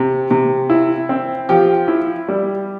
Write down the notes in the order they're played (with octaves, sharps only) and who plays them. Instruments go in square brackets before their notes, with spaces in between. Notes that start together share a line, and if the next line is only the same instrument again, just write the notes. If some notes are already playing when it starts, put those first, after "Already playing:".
Already playing: [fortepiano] C3
C3
E4
C4
F3 G4
E4
G3